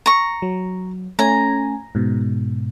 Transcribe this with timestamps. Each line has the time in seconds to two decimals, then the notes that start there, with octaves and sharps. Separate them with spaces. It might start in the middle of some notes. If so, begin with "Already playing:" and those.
0.06 A#5 C#6
0.42 F#3
1.19 A3 C#4 G#5 A#5
1.95 G#2 B2